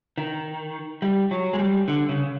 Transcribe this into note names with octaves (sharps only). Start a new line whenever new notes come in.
D#3
G3
F#3
G#3
G3
D3
C#3